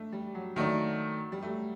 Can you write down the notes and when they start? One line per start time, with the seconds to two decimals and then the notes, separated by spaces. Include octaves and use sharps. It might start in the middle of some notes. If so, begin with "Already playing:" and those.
Already playing: A3 D4
0.12 G3
0.35 F#3
0.56 D#3 F#3 A3 D4
1.32 G3
1.42 A3